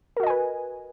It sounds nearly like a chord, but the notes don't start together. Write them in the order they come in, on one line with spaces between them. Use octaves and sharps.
A#4 F#4 D#5 G#5 B4